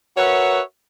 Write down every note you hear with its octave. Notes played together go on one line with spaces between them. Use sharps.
F#4 A#4 B4 C#5 E5 F#5